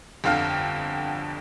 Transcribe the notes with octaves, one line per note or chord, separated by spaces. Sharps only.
G1 F2 D3 F5 G5 F6